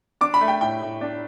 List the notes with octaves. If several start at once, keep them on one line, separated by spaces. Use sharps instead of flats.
D4 D6
B5
A3
G5
A2 G5
A2
D4